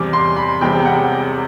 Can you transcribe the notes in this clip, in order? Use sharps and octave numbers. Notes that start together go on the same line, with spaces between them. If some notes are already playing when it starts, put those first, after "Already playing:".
Already playing: E2 C3 G3 D6
C6
B5
E1 E2 C3 G3 G5
F#5